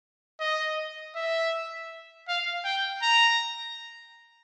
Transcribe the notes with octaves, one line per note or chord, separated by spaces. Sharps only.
D#5
E5
F5
G5
A#5